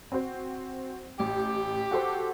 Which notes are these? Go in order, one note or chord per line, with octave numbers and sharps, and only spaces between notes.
C4 F#4 C5
A1 G4
F#4 A4 C5